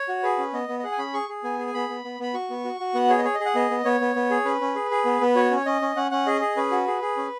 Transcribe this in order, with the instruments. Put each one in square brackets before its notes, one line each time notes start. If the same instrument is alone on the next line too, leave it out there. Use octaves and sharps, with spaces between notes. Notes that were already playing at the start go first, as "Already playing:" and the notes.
Already playing: [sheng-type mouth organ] C#5
F#4
G#4 B4
C#4
B3 D#5
B3
D#5
G#4 F#5
G#5
C#4 B5
G#4 C#6
G#4
B3 G#5
G#4
G#5
B3 B5
B3
B3
B3 B5
F#4 C#6
B3
F#4
F#4
B3 F#5
G#4 C#5
D#5
G#4 C#5
D#5
G#4
F#5
B3 D#5
B3
B3 C#5
B3
B3
G#4
C#4 B4
C#4
G#4
G#4
B3
B3
F#4 C#5
C#4 C#5
C#4 D#5
C#4
C#4 F#5
C#4 F#5
G#4 D#5
G#4
C#4 B4
F#4
G#4
G#4
C#4